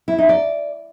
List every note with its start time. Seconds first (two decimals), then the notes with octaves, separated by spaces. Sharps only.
0.08 E4
0.18 D#4
0.29 D5